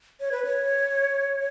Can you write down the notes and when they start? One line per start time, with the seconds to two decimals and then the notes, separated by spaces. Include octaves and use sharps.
0.20 C#5
0.32 B4
0.45 C#5